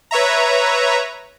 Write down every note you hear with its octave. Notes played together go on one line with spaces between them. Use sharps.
B4 C#5 E5 A#5